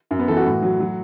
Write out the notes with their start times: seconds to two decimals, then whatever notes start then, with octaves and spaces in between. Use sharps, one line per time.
0.11 F#2
0.19 B3
0.28 E3 A4
0.37 F#4
0.46 A2
0.62 F#3
0.80 F#3